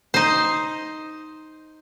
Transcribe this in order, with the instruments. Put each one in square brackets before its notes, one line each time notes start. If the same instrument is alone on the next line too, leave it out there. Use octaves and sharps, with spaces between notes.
[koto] D#4 C5